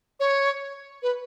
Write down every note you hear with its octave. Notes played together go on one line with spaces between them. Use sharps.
C#5
B4